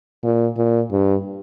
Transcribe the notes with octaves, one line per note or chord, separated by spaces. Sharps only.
A#2
A#2
G2